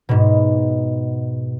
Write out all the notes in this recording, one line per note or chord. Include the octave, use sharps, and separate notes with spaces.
G#2 B2